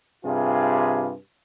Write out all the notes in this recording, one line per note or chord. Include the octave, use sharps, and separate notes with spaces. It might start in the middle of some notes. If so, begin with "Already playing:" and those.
G2 C3 F4 G#4